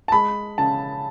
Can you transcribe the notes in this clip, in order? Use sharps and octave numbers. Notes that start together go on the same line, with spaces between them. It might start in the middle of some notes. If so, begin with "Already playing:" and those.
A5
G#3 B5
C#3 A5